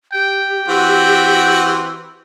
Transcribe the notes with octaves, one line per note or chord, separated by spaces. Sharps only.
G4 G5
E3 C4 F#4